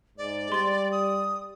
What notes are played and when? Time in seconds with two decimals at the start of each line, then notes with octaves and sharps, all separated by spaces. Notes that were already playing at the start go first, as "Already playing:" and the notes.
0.18 G#2 D5
0.52 G3 C6 A6
0.92 D#6